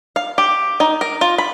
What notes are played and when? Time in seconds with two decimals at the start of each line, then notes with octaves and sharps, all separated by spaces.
0.16 F5
0.38 G4
0.80 D#4
1.01 A#4
1.21 F4
1.38 B5